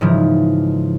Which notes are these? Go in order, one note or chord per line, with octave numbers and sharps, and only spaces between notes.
G#2 C#3 E3 F3